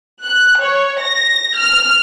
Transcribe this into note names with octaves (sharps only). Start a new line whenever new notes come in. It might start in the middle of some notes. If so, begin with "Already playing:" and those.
F#6
C#5
A#6
F6